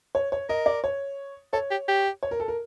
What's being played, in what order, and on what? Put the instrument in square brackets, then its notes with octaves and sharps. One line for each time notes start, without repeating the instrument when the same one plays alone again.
[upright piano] C#5
C#5
[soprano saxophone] A#4 [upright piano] D#5
[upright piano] D5
C#5
[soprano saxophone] A4 [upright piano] C#5
[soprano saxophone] G4
G4
[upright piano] C#5
A#4
A4
A#4